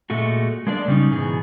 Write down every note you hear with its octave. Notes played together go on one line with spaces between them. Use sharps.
A#2 G#3 A3 F#4
G#3 A#3 D4 D5
C#3 G3 C#4 D#4
G#2 B2 E3 G#4